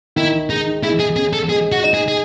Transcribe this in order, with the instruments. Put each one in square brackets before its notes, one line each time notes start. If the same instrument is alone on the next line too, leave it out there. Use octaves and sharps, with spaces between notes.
[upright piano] D#3 [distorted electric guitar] E4
[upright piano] G#3 [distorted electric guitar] D#4
[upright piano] G#3 [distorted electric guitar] E4
[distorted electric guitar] G#4
[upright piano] C#4 [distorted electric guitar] G#4
[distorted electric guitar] A4
[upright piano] G#3 [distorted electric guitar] G#4
[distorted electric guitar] F#4
[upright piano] D#4
[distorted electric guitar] G#4
G#4